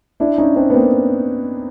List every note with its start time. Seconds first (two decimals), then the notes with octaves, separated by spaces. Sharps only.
0.20 D4 E4
0.38 C#4 D#4
0.56 C4 D4
0.70 B3
0.74 A#3 C4